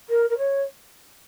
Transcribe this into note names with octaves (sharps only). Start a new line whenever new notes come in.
A#4
A#4
C#5